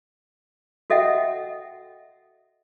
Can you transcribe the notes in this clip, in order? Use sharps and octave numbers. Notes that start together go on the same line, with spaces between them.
F#4 A4 D#5 E5 F#5 G5